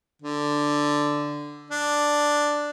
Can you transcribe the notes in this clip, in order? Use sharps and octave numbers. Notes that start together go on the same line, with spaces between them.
D3
D4